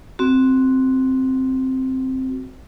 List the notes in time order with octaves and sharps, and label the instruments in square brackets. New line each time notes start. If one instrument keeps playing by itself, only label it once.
[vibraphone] C4 F#4